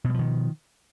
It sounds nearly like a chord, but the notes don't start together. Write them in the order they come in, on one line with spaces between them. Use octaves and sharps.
B2 G3 F3 D#3